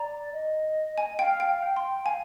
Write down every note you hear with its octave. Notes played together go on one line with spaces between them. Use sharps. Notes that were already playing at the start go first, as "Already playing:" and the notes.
Already playing: D5 A#5
D#5
G#5
F5 G5
G5
G5
C6
F5 G#5